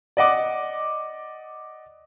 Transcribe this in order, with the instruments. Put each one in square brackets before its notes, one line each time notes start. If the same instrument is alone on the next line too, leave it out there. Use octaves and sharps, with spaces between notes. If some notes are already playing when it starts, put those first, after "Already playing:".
[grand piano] D5 D#5 F#5 D6